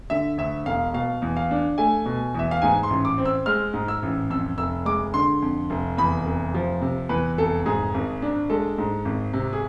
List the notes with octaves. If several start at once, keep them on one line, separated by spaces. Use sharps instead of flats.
D3 E5
D2 E5
E1 F5
B2 F5
E2
F5
D4
A3 G#5
B2
E2 E5
F5
G#2 G#5
C6
A1
D6
C4
E6
G#3 F6
G#2
E6
A1
F2 E6
F1 E6
G#3 D6
D3 C6
F2
F1
E2 B5
F1
F3
C3
E2 B4
F1 A4
G#2 G#4
G#1
D4
G#3 A4
G#2
G#1
C3
G#4